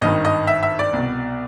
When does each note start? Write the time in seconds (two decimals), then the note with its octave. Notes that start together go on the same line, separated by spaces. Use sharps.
0.01 G#1 G2 D#3 D#5
0.25 D#5
0.47 E5
0.63 E5
0.79 D5
0.93 C2 B2